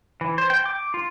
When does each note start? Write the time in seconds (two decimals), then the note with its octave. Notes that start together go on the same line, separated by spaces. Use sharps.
0.21 E3
0.38 C5
0.50 G5
0.66 D6
0.94 F4